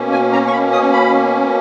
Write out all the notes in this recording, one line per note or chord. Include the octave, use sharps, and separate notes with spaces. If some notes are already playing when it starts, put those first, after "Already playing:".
Already playing: B2 A#3 C#4
G#5
A#5
C#6
B5
D#6
B5